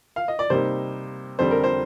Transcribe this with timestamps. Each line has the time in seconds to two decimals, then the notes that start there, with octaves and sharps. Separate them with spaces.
0.16 F5
0.28 D#5
0.39 D5
0.50 C3 G3 A#3 D#4 C5
1.39 F2 D3 G3 C4 C5
1.51 A#4
1.64 C5